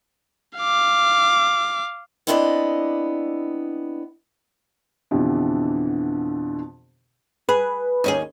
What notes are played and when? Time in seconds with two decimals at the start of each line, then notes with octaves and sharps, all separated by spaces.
0.58 F5 D6
2.27 B3 C4 D4 E4 D5 D#5
5.11 F2 B2 D3 E3 G4
7.49 G#4 B4
8.04 D#2 C#4 G#4